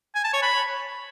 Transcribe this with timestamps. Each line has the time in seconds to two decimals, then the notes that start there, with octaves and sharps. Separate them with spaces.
0.15 G#5
0.24 A5
0.33 C#5
0.42 B5